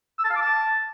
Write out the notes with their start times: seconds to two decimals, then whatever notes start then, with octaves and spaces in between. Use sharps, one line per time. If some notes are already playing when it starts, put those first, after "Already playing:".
0.19 E6
0.24 A5
0.30 F5
0.36 D6
0.41 A5